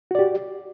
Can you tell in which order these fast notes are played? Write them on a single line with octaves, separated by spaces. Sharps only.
F#4 D5 G4